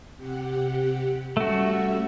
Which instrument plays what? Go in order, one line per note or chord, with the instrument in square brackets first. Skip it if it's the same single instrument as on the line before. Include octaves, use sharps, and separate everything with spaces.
[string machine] C3 G4 F#5
[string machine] G3 C#4 E5 [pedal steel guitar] A3 F#4